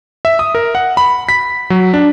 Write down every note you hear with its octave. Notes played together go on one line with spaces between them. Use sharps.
E5
D#6
A#4
F#5
B5
B6
F#3
D4